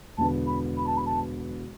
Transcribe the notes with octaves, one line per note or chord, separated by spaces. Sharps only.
E1 E2 D3 B3 A5
B5
B5
A5
B5
A5